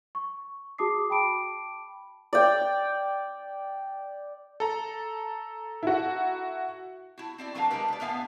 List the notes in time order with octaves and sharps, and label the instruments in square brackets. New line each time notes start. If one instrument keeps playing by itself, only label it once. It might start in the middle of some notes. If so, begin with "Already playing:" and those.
[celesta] C#6
F#4 G#4 A5 D6 D#6 C7
G5 A5 B5 D6 D7
[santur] D5 G5
[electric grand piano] A4 A#5
[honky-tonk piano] E4 F#4
[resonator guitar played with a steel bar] E4 F#4
C4 E4 D5
D3 F#3 D4 A#4 C5 F5
D3 G#3 G4 A#4 B4
B4 D5
A2 D3 B3 E5 F5 G#5